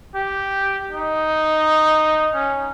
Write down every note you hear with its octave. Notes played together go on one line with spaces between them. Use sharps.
G4
D#4
C#4